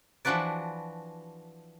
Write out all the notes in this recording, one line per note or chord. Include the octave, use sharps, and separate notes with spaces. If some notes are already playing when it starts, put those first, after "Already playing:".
E3 F3 D4 F#4 B4 D5